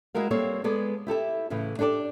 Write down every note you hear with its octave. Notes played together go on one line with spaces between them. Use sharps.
G#3 E4 F#4 A#4 F5
G3 A#3 C4 A4 C#5
G#3 B3 G#4 A4 D5
E4 G4 A4 E5
A2 C#3 E3 A3
D4 G4 A4 B4 D5